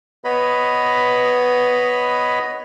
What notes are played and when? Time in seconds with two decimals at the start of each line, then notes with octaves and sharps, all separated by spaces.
0.25 B3 B4 C#5 D#5 B5